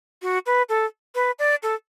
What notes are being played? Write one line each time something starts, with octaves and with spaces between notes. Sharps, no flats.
F#4
B4
A4
B4
D5
A4